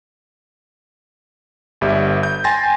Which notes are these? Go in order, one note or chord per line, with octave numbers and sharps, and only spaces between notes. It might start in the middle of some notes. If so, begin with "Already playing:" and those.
G1 G3 E5
G6
G5 G#5 C6 A6 A#6